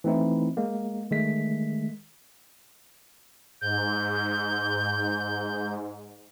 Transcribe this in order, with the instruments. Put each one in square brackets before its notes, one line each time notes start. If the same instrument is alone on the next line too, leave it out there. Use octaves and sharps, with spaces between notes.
[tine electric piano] E3 A3 C4 D#4 E4
G#3 A#3
D#3 G#3 A3 B6
[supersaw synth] G#2 [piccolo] G6